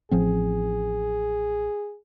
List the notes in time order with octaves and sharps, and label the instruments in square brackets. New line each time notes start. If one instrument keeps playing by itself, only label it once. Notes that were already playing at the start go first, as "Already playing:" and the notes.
[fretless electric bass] A1 F3 C4 [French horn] G#4